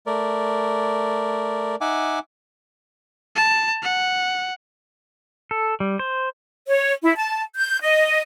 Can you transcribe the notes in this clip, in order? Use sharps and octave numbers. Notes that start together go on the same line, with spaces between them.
A3 A#4 D5
D#4 E5 F#5 G#5 D6
A5
F#5
A4
G3
C5
C#5
E4
A5
G6
D#5